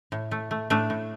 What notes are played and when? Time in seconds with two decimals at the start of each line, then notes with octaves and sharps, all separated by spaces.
0.12 A2
0.31 A3
0.51 A3
0.70 A2 A3 D4
0.90 A2